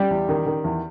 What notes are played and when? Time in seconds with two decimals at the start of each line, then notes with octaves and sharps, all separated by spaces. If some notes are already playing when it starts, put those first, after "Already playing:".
Already playing: G3 G4
0.10 E2
0.29 D#3
0.46 D#3
0.64 E2